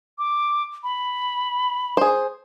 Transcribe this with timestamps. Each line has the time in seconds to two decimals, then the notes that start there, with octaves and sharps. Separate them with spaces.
0.19 D6
0.83 B5
1.97 G#4 C5